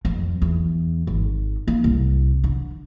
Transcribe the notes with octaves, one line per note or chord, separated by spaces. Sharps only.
F2
E2
G#1
A#3
C2
D3